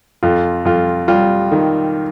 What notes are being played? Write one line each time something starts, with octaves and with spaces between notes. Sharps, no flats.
F2 F4
F2 F4
G3 F4
D#3